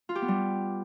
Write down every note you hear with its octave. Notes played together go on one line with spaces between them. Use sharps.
F4
G4
B3
G3